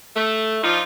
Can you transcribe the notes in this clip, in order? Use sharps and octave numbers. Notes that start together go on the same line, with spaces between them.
A3
F3 D4 D#4 F4